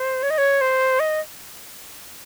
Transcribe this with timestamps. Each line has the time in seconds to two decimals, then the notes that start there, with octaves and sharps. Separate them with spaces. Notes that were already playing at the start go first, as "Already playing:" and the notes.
Already playing: C5
0.23 C#5
0.30 D#5
0.38 C#5
0.61 C5
1.00 D#5